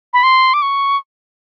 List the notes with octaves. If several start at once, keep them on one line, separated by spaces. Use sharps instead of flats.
B5
C6
D6
C#6